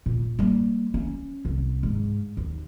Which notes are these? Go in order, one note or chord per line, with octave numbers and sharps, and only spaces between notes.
A#2
G3 A#3
C#4
C2
G#2
D#2